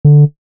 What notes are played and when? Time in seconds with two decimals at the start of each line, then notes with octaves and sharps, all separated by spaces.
0.05 D3